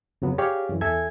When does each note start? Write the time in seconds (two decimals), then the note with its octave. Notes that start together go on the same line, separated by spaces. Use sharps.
0.22 F2 C#3 F#3 B3
0.38 G4 G#4 C#5 D5 F5 G5
0.69 F#2 E3
0.81 E2 A4 E5 G#5 G#6